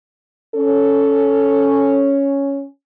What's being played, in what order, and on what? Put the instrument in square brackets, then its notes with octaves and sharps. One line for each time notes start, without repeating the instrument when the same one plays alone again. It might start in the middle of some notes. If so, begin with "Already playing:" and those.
[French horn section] C#4 [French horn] A4